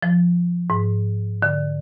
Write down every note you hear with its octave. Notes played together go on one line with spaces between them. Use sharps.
F3
G#2
D3